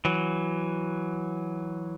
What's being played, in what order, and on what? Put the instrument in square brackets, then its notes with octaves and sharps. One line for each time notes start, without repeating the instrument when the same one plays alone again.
[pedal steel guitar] E3 F#3